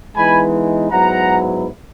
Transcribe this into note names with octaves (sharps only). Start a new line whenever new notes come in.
E3 G#3 B3 D#4 G#5 B5
G#2 F#3 B3 E4 F#5 A#5